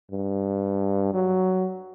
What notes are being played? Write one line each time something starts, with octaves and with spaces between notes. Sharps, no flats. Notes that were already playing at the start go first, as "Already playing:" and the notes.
G2
F#3